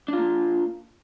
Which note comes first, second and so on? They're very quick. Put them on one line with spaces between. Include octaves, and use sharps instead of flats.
D4 F4 A#3